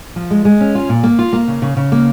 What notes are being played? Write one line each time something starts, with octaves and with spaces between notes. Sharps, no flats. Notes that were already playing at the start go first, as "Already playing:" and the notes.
F3
G#3
G#3
C#4
F4
A#2
A#3
F4
A#3
C#3
C#3
C#3
A#3